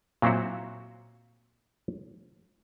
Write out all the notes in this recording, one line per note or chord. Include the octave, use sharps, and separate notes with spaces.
A#2 F#3 C4 E4 F#4